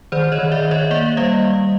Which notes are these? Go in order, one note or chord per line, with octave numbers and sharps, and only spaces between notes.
D#3 C5 D5
C#5 D#5
D#3
D5 E5
D#3
C#5 D#5
A#3 D5 E5
E5
G3 D#5 F5